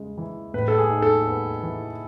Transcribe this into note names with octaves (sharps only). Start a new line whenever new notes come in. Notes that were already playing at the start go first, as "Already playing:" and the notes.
Already playing: C#3 G#3
E3
A2 B4
A4
G#4
D#4
A4
B3
E3